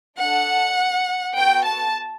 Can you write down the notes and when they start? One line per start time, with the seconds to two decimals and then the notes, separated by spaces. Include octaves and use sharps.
0.18 D4 A4 F#5
1.34 B3 F#4 A4 G5
1.64 A5